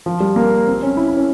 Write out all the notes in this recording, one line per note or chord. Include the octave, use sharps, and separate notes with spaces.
F3
G3
A#3
C4
C#4
E4
E4
C#4